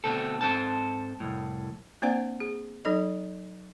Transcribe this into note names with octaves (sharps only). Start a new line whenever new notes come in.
B2 D3 A3 C4 A4
G#2 C4 A4 C5 A5
C2 F2 A2
A#3 C4 D4 C5 D5 F#5
G#4
F#3 D#4 A4 D#5